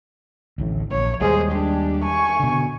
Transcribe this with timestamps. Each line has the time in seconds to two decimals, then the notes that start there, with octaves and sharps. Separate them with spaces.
0.58 D1 A1 A2
0.91 A#1 C#5
1.21 D#2 G3 G#3 G#4 C5
1.52 D4 G4
2.04 G#5 C#6
2.40 B2 D3